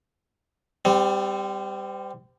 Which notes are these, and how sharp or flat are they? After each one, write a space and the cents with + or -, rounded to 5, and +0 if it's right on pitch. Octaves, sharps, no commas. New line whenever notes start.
G3 +10 C4 -30